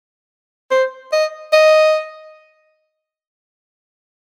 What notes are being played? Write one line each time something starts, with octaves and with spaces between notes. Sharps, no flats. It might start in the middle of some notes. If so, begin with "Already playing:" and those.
C5
D#5
D#5